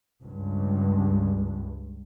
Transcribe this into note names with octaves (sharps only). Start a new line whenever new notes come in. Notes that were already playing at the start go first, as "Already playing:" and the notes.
C#2 G2